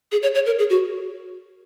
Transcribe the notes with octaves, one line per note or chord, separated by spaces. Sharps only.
G#4
C#5
C#5
A#4
G#4
F#4